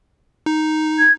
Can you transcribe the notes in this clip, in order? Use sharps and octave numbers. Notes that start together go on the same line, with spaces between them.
D#4
G#6